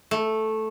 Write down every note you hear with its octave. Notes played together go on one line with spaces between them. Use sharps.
A3